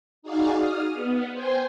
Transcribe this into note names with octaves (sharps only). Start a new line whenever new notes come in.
D#4 F#4 G#4 D5 F5
D#6 F6
B3
C5 G5 G#5 C6